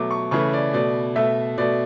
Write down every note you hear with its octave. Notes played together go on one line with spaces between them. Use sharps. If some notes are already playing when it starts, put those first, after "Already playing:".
Already playing: B2 F#3 A3 D6
C#6
C#3 E3 A3 C#6
D5
B2 A3 D5
B2 A3 E5
B2 A3 D5